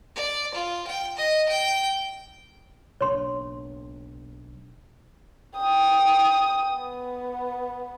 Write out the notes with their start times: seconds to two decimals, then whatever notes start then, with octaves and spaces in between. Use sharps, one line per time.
0.16 D5
0.54 F4
0.87 G5
1.17 D#5
1.49 G5
3.01 B1 D4 C#5 C6
5.57 G5 D#6
6.76 B3